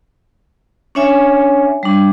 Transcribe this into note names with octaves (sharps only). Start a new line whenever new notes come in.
C#4 D4 C#5 E5 G#5
G3 D4